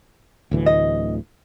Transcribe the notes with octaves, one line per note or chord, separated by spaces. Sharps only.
D1 D2 E3
D#5